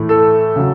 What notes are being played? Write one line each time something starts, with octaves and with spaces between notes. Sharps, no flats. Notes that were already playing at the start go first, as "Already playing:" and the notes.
Already playing: A2 E3 A3
A4
C#3 F#3